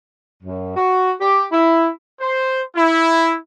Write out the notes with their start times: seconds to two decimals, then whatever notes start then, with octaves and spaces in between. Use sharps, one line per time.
0.43 F#2
0.76 F#4
1.20 G4
1.52 E4
2.20 C5
2.76 E4